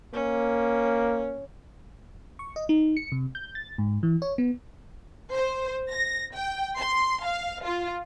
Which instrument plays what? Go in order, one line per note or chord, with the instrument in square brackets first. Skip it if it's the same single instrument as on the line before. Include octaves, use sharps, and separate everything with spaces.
[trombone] A#3 [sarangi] C#4
[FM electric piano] C#6
D#5
D#4
C#7
C3
G6
A6
G#2
E3
C#5
B3
[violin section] C5
A#6
G5
C6
F5
F4